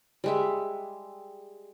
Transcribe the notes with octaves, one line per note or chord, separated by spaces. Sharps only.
G3 G#3 E5